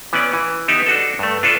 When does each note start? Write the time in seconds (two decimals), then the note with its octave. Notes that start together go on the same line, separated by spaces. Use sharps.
0.13 E3 B3 C#4 D5
0.33 E3
0.68 B3 D#4 G4 E5 F#5
0.87 D4 F#4 A4
1.19 G2 A3
1.43 D4 F4 A4 B4 E5